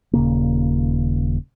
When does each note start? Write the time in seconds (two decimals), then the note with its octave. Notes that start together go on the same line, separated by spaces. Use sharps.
0.13 D#1 C#3 A#3